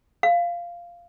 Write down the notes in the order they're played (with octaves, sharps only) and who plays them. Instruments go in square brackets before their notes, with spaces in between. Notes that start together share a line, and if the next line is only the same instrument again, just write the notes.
[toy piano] F5